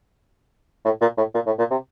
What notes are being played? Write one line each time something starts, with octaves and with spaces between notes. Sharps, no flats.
A2
A#2
A2
A#2
A2
A#2
C3